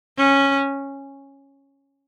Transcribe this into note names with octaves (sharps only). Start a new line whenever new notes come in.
C#4